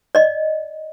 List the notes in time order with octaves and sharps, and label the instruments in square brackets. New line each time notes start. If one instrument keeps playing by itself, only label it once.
[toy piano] D5 D#5